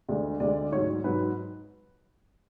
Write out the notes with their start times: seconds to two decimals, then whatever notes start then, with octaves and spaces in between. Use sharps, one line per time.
0.08 D2 D3 G#3 D5
0.40 D2 D3 G#3 D5
0.72 G#2 F#3 C#5
1.04 G#2 F#3 B4